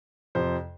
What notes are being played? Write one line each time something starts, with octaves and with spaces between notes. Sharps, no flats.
F2 C3 F3 C5